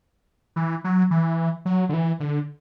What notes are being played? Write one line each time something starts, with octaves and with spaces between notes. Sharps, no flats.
E3
F#3
E3
F#3
D3
E3
D3